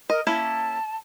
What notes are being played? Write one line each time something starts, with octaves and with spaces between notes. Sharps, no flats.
A#4 D#5
A#3 C#4 E4 A5